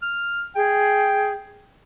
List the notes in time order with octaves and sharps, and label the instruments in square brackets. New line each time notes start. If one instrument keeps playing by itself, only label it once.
[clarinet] F6
[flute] G#4 [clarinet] G5